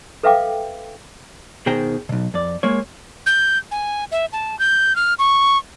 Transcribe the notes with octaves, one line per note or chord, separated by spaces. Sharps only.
A4 B4 E5 F5 G5 D6
B2 D#3 G#4 C5 G5 A#5
B1 B2
F2 D5
G#3 A#3 C#5
G6
G#5
E5
A5
G6
F6
C#6